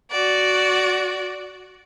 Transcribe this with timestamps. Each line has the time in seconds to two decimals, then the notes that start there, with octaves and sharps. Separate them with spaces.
0.12 F#4 D5